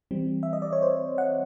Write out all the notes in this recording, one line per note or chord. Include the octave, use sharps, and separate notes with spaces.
E3 G3 C4
E5
D#5
D5
C#5
C5
F#5